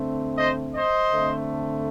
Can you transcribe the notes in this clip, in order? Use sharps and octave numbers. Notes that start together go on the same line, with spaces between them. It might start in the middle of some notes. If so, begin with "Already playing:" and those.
Already playing: D3 A3 C4
C5 D#5
C5 D#5
D3 A3 C4